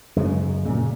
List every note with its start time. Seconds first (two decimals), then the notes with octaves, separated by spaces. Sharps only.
0.16 F#2 C#3 G#3
0.66 A#2 C#3